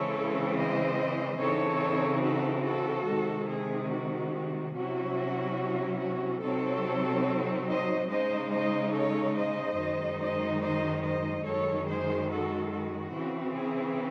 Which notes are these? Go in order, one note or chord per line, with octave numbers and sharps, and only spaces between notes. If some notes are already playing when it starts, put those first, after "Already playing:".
Already playing: C#3 E3 G#3 C4 A4 C#5
C5 D#5
C#3 E3 C4 D#4 A4 C#5
F#4 A4
F#4 A4
C3 D#3 G#3
G#4
F#4
C3 F#3 C#4 E4 F#4
F#4
C3 F#3 C4 D#4 A4 C#5
C5 D#5
C#3 G#3 D#4 C5 D#5
C5 D#5
A4 C#5
C5 D#5
F#2 D#3 G#3 D#4
C5 D#5
C5 D#5
C5 D#5
F#2 D#3 G#3 A4 C#5
G#4 C5
F#4 A4
F#4
C#3 E3 C4
G#4